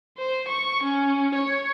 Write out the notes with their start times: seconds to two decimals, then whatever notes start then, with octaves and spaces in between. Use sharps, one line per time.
0.18 C5
0.48 C#6
0.83 C#4
1.35 C#5